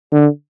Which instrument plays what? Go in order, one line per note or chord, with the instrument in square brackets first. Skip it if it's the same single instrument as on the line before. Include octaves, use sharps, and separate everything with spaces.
[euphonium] D3